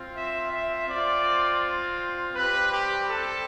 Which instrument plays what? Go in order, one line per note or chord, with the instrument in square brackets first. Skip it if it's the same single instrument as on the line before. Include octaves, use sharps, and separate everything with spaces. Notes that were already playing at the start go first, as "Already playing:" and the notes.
Already playing: [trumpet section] C4 F4
E5
E5
C4 F4 D5
G3 C4 G4 B4
G4
A4